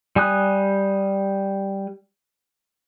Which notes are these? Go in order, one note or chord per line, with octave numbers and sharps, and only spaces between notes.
G3 G#5 D#6 F#6